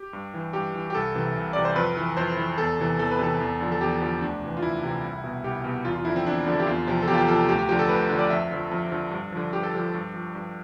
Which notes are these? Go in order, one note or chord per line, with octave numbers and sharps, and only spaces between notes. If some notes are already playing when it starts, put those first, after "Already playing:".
Already playing: G4
G2
E3
G2 G4
E3
G4
C2 A4
C3 E3
C2
C3 E3 D5
C5
F2 B4
E3
F2 C5
E3
E2 A4
C3 E3
E2 A4
B4
C3 E3 A4
E2
D3 F3
A4
E2 G4
D3 F3
D2 D4
C3 E3
F4
D2 E4
C3 E3
C2
B2
C2 G4
B2
E2 F4
F4
D3 F3 E4
C4
E2 D4
D3 F3
A4
G4
E2 F4
C3 F3
A4
E2 G4
F4
G4
C3 F3 A4
D2 G4
G4
D3 F3 G4
A4
D2 B4
D3
F3 D5
F2 E5
D3 F3
F2
D3 F3
G2
D3 F3
G2 G4
A4
D3 F3 G4
G2
F3
G2